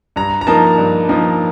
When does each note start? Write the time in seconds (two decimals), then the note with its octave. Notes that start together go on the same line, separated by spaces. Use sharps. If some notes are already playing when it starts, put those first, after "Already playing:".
0.16 G2 A#5
0.41 A#5
0.47 F3 A#3 D#4 A5
0.78 G2
1.09 F3 A#3 D#4